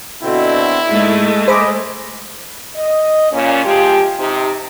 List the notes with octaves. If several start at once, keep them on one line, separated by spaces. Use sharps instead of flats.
B2 D3 C4 E4
G#2 G#3 A3
G#4 C5 D#5 B5 D6
D#5
A#2 C#4
C3 F3 G#3 F4 G4
C3 D#4 G4